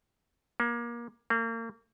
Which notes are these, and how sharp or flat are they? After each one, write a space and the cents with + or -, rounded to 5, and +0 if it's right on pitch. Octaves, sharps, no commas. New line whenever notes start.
A#3 +25
A#3 -35